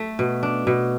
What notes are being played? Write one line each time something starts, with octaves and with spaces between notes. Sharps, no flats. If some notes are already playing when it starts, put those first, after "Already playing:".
Already playing: A3
B2
D4
B2